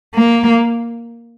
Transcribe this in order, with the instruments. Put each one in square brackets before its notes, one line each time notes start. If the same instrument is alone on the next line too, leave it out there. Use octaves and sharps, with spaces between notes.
[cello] A#3